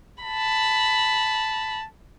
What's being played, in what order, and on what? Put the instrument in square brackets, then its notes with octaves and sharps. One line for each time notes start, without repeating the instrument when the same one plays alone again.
[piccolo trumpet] A5 [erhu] B5